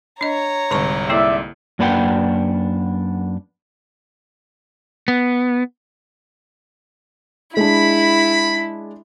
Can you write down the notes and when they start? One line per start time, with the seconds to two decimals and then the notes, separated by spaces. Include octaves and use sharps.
0.21 D4 C#5 D#5 A#5
0.71 C2 G#2 D3 A5 C#6
1.09 A#3 E4 A4 D5 E5
1.79 F#2 A#3 D4 B4 F#5 G5
5.08 B3
7.57 G#3 D4 E4 B5